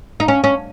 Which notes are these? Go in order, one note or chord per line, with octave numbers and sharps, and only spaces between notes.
D#4
C#4
C#4